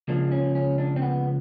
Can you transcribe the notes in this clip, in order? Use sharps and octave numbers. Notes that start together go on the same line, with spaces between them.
C#2 C#3 F3 A#3 D4
C#4
C#4
D4
C4
B3